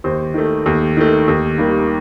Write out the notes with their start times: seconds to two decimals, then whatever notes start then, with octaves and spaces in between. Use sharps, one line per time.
0.04 D#2 C5
0.34 D#3 A3
0.66 D#2
0.97 D#3 A3
1.28 D#2
1.58 D#3 G3 A#3